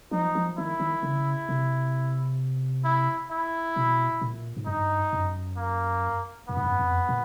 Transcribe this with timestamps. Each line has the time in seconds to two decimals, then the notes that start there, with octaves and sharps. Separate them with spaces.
0.11 F3 D#4
0.35 F3
0.58 D#3 E4
0.80 D#3
1.03 C#3
1.49 C3
2.84 E4
3.31 E4
3.76 B2
4.21 A#2
4.57 G#2
4.66 G2 D#4
5.13 F#2
5.57 A#3
6.49 F#2 B3
6.57 G2
6.64 F#2
6.79 F2
7.09 A#2